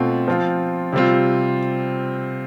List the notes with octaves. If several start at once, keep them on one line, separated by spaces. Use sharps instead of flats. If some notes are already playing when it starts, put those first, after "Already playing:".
Already playing: B2 A3 C4 F4
F3 C4 F4
C3 G3 C4 F4